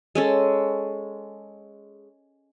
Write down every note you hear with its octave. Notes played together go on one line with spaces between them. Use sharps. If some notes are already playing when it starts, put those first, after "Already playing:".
G#3 C#4 A4